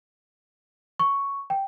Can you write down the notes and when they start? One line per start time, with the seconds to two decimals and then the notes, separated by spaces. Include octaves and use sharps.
0.99 C#6
1.50 G5